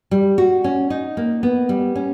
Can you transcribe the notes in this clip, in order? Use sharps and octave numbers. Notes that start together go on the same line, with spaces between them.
G3
F#4
C#4
D#4
A#3
B3
G3
C#4